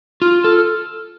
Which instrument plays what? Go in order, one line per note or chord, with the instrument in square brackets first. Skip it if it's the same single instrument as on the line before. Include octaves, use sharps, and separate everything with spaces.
[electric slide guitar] F4 [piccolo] F6
[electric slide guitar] A4